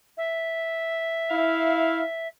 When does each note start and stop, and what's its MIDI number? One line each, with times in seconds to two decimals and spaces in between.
0.17 2.28 76
1.30 2.02 64
1.30 2.02 77